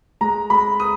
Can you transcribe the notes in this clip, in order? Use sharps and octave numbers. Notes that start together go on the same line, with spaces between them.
G#3 A#5
G#3 B5
D#6